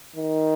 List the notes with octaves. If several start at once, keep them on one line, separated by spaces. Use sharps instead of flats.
D#3